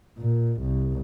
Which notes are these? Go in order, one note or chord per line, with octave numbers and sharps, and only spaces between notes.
A#2
C2